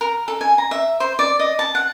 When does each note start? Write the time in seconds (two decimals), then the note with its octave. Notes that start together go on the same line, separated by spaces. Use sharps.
0.01 A#4
0.28 A4
0.41 G#5
0.58 A#5
0.71 E5
1.00 C5
1.19 D5
1.39 D#5
1.59 A5
1.75 F#5